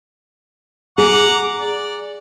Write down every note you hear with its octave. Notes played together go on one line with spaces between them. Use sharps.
G#4 F#5 A#5 D6
D5